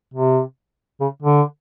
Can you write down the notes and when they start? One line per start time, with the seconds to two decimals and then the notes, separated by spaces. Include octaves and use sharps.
0.14 C3
1.01 C#3
1.23 D3